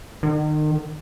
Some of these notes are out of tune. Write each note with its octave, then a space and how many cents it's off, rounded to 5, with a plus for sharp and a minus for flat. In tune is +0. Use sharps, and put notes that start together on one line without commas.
D#3 -35